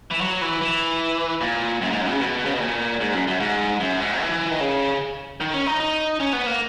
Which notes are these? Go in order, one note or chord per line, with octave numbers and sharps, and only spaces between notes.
E3
F#3
E3
E3
A#2
F#2
G#2
F#2
C#3
B2
C#3
B2
A#2
G#2
F#2
F#2
G#2
F#2
G#2
E3
D#3
C#3
D#3
C#4
D#4
D#4
C#4
B3
A#3